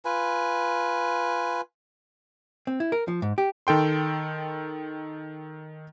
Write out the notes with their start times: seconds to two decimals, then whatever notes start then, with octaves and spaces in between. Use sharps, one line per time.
0.05 F4 B4 G#5
2.67 C4
2.80 E4
2.92 A#4
3.08 F3
3.22 G#2
3.38 G4
3.67 D#3 A4 G5 C6